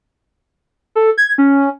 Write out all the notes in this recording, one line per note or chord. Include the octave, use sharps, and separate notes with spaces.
A4
G#6
C#4